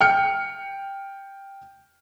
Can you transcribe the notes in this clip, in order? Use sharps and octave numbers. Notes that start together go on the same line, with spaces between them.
G5 F6 C#7